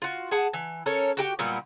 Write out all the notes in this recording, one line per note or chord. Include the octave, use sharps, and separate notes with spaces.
F4 F#4
G#4 F#5 A5
E3
C#4 A4 A#4 C#5
F#4 G4 G5
A#2 F#3 G3 B3